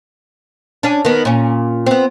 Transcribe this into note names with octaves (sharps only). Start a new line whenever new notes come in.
C#4 D4
D#3 B3
A#2 C#4
B3 C4